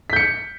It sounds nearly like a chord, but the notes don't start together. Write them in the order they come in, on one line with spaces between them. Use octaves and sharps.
B6 G6 C#7